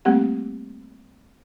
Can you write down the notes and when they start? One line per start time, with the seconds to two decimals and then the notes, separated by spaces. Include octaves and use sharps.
0.05 G3 A3 A#3 C4 G4 F#5